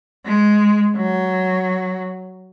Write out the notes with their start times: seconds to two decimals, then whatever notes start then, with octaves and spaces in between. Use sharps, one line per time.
0.25 G#3
0.96 F#3